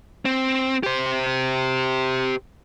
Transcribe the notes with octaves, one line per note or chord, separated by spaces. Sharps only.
C4
G4 C5